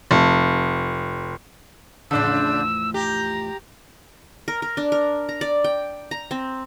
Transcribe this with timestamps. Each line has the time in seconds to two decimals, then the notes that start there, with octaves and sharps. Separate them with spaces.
0.11 F1
2.11 E2 A2 C#3 F3 D4 E6
2.94 G4 A#5
4.48 A#4
4.62 A#4
4.77 D4
4.92 A#4
5.29 A#5
5.41 D5
5.64 G5
6.11 A#5
6.31 C4